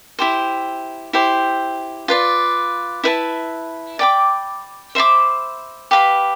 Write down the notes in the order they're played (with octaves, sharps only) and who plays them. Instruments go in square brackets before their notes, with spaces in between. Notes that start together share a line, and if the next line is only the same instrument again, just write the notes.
[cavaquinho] E4 G4 C5
E4 G4 C5
F4 B4 D5
E4 B4 E5 A5
D5 G5 B5 D6
C5 E5 B5 D6
G4 B4 F5 B5